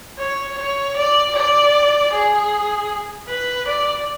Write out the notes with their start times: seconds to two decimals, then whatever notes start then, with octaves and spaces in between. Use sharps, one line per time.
0.18 C#5
0.58 C#5
0.96 D5
1.35 D5
2.13 G#4
3.28 B4
3.67 D5